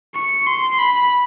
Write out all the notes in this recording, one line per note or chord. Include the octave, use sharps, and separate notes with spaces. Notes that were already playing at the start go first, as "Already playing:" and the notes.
C#6
C6
B5